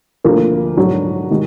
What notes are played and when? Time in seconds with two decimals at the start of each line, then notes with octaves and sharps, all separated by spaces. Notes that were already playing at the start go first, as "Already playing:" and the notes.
0.24 D2 D3 F3 A#3
0.77 G#2 F#3 D4 F#4
1.30 D#3 G#3